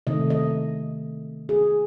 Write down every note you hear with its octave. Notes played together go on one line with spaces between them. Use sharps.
C3 D#3 A3 D#5
D#5
G#4